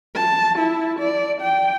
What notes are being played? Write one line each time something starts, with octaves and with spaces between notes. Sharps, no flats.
A5
E4
D5
G5